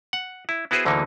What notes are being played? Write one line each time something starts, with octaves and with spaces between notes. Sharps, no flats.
F#5
E4
B3 E4 F#4 G#4 B4 C5
D2 D3 E3 F#3 A#3 D#4